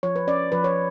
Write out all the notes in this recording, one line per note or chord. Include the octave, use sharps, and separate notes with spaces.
F3 C#5
B4
C#4 D5
F3 B4
C#5